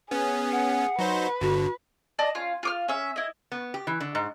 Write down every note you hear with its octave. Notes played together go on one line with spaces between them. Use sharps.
B3 C#4 G#4
F#5
F#3 D#4 B4 C5
G1 D3 F#4
D5 D#5 A5
C#4 F4
F4 D6 F6
C#4 E5
E4 D#5
B3
G4
E3
D3
G#2